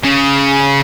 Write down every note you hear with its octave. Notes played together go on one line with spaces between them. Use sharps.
C#3